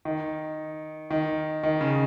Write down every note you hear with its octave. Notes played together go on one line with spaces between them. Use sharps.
D#3
D#3
D#3
C#3